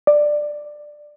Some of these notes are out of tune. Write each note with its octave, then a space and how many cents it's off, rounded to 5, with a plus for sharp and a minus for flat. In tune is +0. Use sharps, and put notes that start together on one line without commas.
D5 +15